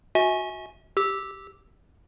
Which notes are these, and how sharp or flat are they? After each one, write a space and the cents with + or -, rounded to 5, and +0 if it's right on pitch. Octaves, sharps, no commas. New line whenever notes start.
F#4 -15 E5 -40 G#5 +10
G4 +0 E6 -5